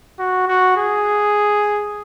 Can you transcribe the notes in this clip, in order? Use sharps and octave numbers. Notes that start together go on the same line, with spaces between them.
F#4
F#4
G#4